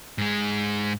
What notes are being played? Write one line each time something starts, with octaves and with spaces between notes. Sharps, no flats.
G#2 G#3